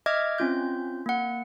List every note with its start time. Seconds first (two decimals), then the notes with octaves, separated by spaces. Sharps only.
0.06 D#5 E5 D6 F6 G#6
0.38 C4 C#4 F4 G6
1.06 A#3 F#5